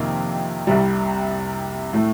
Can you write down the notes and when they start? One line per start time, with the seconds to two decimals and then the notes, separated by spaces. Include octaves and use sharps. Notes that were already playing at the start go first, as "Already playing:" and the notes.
Already playing: F2 C3 D#3 A#3
0.67 C2 C3 G3
1.93 A2 A3